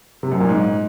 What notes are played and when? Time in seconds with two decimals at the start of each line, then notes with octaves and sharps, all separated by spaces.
0.23 C3
0.32 F#2
0.40 A#2
0.49 G#2